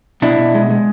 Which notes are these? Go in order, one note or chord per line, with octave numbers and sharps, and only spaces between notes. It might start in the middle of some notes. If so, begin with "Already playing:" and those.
B2 D4 E4
B2
G#3
G#3